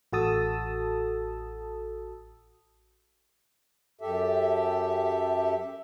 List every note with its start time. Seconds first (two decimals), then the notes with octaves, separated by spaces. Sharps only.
0.13 A1 F#4 A4 A5 D#6 E6
4.01 F#2 G4 A4 E5